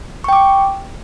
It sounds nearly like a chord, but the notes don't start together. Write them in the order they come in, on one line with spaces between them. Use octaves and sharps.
C#6 G5 D6